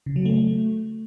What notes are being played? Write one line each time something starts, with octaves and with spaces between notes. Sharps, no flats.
C#3
F#3
A3